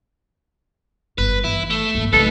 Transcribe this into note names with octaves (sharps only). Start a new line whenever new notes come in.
G1 B4
E3 E4
A3
G#1 A#3
C2 A3 D#4 A4 B4